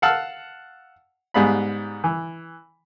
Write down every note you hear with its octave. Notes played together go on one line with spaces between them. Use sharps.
F5 F#5 A5 E6 F6
G#2 G3 B3 F5 B5
E3